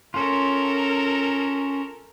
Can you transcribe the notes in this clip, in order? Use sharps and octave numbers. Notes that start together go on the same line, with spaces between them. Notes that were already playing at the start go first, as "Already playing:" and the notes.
C#4 F4 A4 A#4